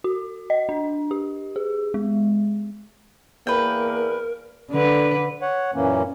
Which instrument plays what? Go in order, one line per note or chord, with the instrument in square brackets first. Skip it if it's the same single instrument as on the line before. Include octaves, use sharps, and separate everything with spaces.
[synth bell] F#4
D#5
D4
G4
G#4
G#3
[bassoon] E2 [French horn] A#3 [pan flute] A#4 [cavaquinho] B4 G5
[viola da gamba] D3 B4
[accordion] C#5 F#5
F#2 A#2 E3 A#3 C#4